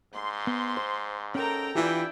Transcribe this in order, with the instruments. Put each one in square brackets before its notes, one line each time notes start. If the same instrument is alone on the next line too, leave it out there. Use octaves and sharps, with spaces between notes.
[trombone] G#2 [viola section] C6
[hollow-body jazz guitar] B3
C5
[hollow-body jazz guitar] C#4 A#4 [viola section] A4 G5 A#5
[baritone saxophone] E3 [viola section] D4 E4 G5 [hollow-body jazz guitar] F4 G4